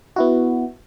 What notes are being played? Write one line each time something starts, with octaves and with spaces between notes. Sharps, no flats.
B3 E4 F#4